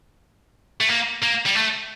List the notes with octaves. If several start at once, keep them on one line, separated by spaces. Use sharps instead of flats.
A3
A#3
A#3
G3
A3